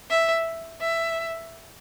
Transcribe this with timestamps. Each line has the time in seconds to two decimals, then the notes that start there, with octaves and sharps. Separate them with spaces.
0.10 E5
0.81 E5